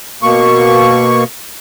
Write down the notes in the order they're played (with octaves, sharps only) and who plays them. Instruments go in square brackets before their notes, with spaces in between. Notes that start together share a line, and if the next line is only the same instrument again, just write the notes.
[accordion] B2 A#3 C#6